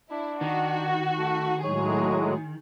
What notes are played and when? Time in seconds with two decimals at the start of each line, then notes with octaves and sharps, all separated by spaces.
0.11 D4 E4
0.41 D#3 F#4
1.18 A3
1.64 A2 F#3 G#3 G#4 C#5